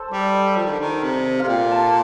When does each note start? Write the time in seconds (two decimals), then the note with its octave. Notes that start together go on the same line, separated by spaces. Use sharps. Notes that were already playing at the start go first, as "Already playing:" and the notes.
Already playing: A4 C5
0.11 G3 D5
0.34 D#5
0.57 F3
0.65 D#3
0.72 D3
0.80 D#3
1.03 C3
1.39 C3 F5
1.48 A#2 G5
1.71 A5